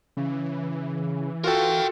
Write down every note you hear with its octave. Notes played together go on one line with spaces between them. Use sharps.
C#3 E3
F4 F#4 A4 A#4 F5 G5